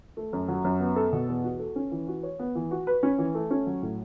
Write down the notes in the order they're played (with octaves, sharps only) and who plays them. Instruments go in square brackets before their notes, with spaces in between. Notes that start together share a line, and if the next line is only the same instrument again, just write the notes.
[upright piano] A3
F#2
F#3
F#2
B3
A4
B2
E2
F#4
A4
C#4
E3
F#4
C#5
B3
E3
F#4
B4
C#4
E3
A3
C#4
F#3
A2